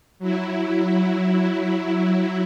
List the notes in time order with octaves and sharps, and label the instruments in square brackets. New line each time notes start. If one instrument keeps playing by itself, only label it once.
[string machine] F#3 E4